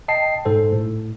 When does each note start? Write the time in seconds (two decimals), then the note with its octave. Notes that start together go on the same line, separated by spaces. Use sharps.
0.08 D#5 G5 A5 C7
0.45 G#2 A4 C5
0.72 A2